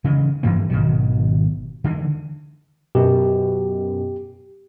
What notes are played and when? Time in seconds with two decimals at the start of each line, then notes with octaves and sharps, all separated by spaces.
0.04 C#3 E3 G#3
0.43 G2 E3 F3 A#3
0.70 G#1 B2 D#3 F#3
1.84 D3 E3 G#3
2.95 F#2 B2 G4